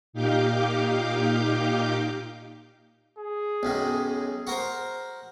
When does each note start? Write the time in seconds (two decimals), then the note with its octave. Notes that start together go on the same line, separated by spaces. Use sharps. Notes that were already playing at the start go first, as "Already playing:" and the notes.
0.13 A#2 D#4 G4 F5 D6 G6
3.18 G#4
3.63 B1 F#2 D#3
4.47 F#4 A#4 C5